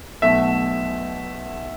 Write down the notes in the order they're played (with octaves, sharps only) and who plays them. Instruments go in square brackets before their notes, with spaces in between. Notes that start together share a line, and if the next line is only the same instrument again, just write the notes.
[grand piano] B1 B2 A3 E5